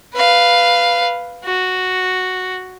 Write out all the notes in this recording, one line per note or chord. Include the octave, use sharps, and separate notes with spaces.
B4 F5
F#4